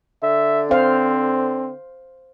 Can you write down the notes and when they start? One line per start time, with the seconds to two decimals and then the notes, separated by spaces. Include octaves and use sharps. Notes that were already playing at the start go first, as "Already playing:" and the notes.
0.23 D3 E5
0.71 C4 C5 F5